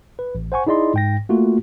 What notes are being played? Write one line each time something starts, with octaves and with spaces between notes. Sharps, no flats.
B4
A1
C5 F#5 G#5 C#6
D#4 E4 G#4 D5 D#5 C6
G#2 G5 A#6
A3 A#3 F4 F#4